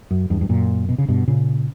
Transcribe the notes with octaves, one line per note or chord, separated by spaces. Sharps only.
F#2
E2 G2
G2
F#2 A#2
B2
C#3
G2 B2
A#2 C#3